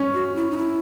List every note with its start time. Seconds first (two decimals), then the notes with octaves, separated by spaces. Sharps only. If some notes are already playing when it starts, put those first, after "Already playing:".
Already playing: C#4
0.14 F#4
0.36 E4
0.51 D#4
0.57 E4